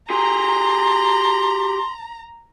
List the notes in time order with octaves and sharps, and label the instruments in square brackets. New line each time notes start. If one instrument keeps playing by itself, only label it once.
[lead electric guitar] G4 G#4 [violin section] A#5 [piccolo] C6